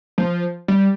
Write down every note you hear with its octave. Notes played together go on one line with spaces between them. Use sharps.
F3
G3